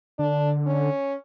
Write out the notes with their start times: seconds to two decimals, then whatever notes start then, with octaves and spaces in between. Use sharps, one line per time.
0.19 D3 D4
0.67 C#4